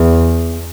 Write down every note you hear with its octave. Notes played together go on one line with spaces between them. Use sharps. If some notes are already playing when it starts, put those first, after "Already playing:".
Already playing: E2